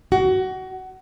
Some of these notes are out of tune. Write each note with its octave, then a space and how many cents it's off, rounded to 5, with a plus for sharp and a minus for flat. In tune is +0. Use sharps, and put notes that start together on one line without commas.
F#4 +20